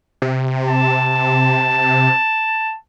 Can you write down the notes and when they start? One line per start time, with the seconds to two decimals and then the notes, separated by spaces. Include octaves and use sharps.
0.22 C3
0.69 A5